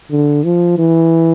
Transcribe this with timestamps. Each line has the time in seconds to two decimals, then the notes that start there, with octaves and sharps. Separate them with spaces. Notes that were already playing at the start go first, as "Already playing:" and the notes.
0.11 D3
0.44 F3
0.78 E3